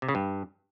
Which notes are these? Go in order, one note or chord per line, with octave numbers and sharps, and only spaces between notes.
C3
C#3
G2